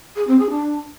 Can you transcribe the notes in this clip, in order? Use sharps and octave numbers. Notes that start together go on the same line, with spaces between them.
G#4
C4
G#4
D4